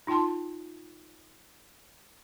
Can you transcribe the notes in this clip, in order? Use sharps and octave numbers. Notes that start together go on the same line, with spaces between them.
D#4 F4 G5 A5 C6